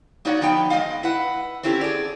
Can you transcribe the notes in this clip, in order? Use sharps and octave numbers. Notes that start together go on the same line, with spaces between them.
A#3 D#4 F#4 C#5 D5 F#5
F3 B3 D#4 G5
G#3 A#3 D#5 F5
E4 B4 F#5
C4 C#4 E4 G4 A4
G#4 D5